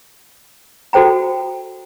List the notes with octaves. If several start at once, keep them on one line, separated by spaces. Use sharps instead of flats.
F#4 A4 C5 G5 A#5